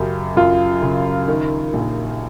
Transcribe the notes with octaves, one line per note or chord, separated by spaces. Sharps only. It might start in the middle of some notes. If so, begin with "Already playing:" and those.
Already playing: F#2 C#3 G4
F#2 F4
C#3
D#3
A#1